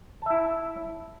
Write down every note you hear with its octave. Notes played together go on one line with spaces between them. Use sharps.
E4 E5 A5